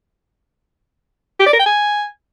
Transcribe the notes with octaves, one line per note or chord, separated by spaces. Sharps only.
G4
D5
A#4
G5
G#5